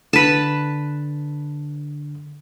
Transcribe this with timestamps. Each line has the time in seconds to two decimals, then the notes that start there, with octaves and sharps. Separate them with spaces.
0.13 D3 B4 A5